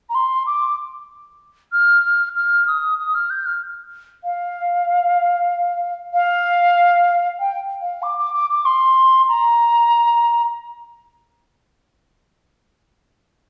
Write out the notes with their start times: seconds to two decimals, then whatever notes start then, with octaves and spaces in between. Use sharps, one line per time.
0.09 A#5
0.14 C6
0.46 D6
1.72 F6
2.35 F6
2.67 D#6
2.98 D#6
3.14 F6
3.30 G6
3.46 F6
4.24 F5
6.13 F5
7.39 G5
7.81 F5
8.02 D6
8.18 D6
8.34 D6
8.50 D6
8.65 C6
9.28 A#5